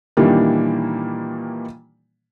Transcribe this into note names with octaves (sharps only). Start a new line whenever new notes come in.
A#2 D#3 E3 G3 A#3 D4